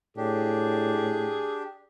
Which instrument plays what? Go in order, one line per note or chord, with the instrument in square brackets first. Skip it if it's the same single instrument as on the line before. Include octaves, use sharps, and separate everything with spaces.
[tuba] A2 [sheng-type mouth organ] D4 G4 [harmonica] G#4